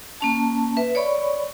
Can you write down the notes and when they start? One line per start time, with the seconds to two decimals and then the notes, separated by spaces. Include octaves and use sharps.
0.21 A#3 C#4 A5
0.77 B4 E5
0.95 C#5 D5 B5 C#6